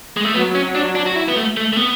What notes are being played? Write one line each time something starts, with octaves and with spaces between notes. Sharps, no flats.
G#3
A3
F#3 B3
C#4
D4
D4
F#4
E4
B3
A3
A3
A3
B3